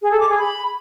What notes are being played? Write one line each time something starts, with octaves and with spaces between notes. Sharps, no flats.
G#4
A4
D6
G#4
B5